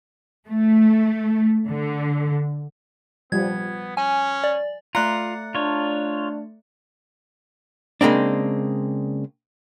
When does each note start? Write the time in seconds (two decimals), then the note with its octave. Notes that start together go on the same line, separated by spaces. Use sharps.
0.47 A3
1.67 D3
3.32 F3 G3 B3 G#6
3.97 C#4 G#5
4.44 D5
4.95 A3 F4 D5 A#5 F#6 C#7
5.55 D4 F4 C#5
8.01 C#3 G#3 A#3 C4 D4